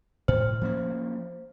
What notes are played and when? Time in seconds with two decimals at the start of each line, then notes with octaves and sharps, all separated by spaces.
0.28 A2 C5
0.61 F3 A#3 C#4